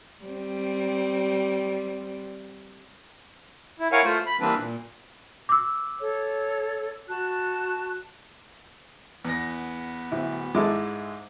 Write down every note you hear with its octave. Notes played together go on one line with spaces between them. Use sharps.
G3 C4
E4
E4 A#4 C#5 F5 F#5 G#5
A3 F4 C5
B5
E3 G3 A#3 C4 D4 B4
A#2
D6 E6
A4 C#5
F#4 A5 F#6
E2 B3 A#6
D1 E4
G#2 G#3 E4 A4 D6